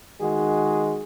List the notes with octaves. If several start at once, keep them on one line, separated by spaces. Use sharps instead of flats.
D#3 G#3 F#4 G#4